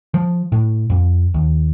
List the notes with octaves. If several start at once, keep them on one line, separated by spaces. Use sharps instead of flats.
F3
A2
F2
D#2